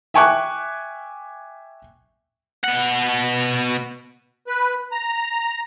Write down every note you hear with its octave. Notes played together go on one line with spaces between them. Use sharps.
E5 G5 G#5 C#6 D6 F#6
B2 F#5
B4
A#5